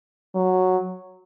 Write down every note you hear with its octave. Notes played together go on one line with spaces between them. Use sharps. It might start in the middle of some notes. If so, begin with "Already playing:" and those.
F#3